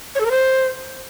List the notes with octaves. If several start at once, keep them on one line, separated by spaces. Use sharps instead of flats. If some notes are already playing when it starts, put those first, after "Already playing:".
C#5
A4
A#4
C5